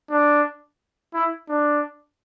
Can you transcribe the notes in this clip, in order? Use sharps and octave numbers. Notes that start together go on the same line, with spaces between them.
D4
E4
D4